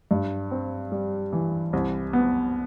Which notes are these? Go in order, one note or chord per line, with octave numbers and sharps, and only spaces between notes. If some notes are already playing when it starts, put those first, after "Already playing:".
G2
C4
G3
E3
C2
B3